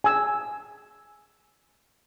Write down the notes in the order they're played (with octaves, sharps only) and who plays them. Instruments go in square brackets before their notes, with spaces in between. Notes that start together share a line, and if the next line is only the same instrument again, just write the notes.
[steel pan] G#5 E6